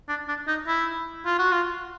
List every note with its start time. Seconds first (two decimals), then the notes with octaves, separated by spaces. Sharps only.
0.09 D4
0.28 D4
0.48 D#4
0.67 E4
1.26 F4
1.39 F#4
1.52 F4